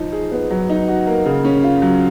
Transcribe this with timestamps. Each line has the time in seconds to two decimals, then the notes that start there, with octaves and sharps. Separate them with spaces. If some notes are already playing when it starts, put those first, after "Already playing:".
Already playing: F3 D#4
0.12 G#4
0.32 B3
0.50 F#3
0.70 D#4
0.88 F#4
1.07 A#3
1.25 C#3
1.45 C#4
1.63 F4
1.82 F#3